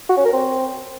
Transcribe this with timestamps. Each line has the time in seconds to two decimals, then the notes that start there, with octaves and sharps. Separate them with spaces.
0.09 F#4
0.17 C#4
0.25 A#4
0.33 C4